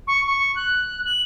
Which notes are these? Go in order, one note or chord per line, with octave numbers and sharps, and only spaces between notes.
C#6
C#6
F#6
F#7